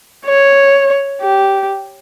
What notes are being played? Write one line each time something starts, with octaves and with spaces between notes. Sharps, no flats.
C#5
G4